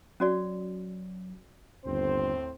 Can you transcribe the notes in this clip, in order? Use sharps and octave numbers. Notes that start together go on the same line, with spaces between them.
F#3 C#4 F#4 D5
G1 D#2 A2 C4 C5